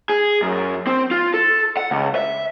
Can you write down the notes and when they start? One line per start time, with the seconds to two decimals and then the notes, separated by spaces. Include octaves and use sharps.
0.09 G#4
0.42 F#2
0.87 C4
1.11 F4
1.34 A4
1.77 F#5
1.91 C#2
2.15 E5